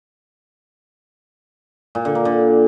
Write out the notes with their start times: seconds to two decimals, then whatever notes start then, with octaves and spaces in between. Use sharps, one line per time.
1.95 A#2
2.05 D3
2.15 A#3
2.25 D3